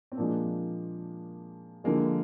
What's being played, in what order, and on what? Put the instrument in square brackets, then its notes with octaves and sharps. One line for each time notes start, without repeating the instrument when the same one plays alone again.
[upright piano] C4
A#2 F3 G#3 A#3 D4
D3 F3 G#3 A#3